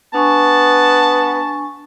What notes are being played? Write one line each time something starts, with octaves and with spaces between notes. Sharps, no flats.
B3 D4 G#5 A5 C#6